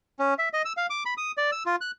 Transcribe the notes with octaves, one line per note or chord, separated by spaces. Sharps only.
C#4
E5
D#5
E6
F5
D6
B5
D#6
D5
E6
F4
F#6